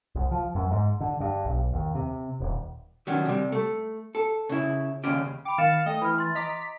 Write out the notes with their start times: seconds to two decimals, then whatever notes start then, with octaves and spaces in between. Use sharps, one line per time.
0.15 C2
0.31 F3
0.55 F#2
0.71 G#2
1.00 D3
1.20 G2
1.45 B1
1.73 D#2
1.95 C3
2.40 D#1
3.07 D#3 E3 F#3 C#4 D4
3.26 C3 G3
3.52 A3
4.15 A4
4.49 C#3 E4
5.04 D#2 C#3 C#4 D5
5.45 G5 B5 D6
5.58 D#3 F5 A6 C#7 E7
5.86 A3 D#5 G5
6.02 E3 B5 F6
6.18 C6 A6
6.35 D#5 A#5 D6 B6